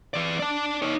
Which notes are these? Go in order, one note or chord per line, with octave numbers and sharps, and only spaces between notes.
E3 D5
D5 A5
D#4 C#5